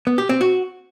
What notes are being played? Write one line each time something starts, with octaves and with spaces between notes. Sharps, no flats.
B3
G4
C4
F#4